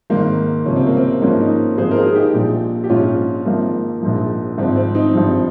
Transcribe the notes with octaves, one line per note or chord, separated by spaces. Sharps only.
G#1 G#2 D#3 A#3
C#2 C3 F3 C#4
C4
A#3
C4
G#1 G#2 F3 A#3 C#4
C4 D#4
G#1 G#2 F3 G#4 C5
A#4
F4 G#4
G#4
D#4 G4
A#1 A#2 F3
G4
A#1 G#2 F3 C#4 F4
G#1 G#2 F3 A#3
A#1 G#2 F3
G#1 G#2 F3 C4
C4
C4 D#4
G#1 G2 F3